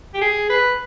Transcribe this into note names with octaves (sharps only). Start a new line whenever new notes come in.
G4
G#4
B4